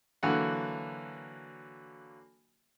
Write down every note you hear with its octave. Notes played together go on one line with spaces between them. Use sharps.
D3 E3 F#3 A#3 F#4 F#5